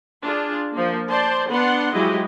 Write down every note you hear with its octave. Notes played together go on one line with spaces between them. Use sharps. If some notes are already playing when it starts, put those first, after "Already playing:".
D4 F4 G#4
F3 A#3
C5 D5 A5 C6
B3 D4 F#5 C6
F3 F#3 G#3 E4 G4 D#5